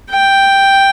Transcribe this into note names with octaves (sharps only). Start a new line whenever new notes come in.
G5